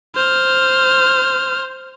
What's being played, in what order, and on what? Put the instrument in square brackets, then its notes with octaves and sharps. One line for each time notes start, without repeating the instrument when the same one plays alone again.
[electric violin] C5 F6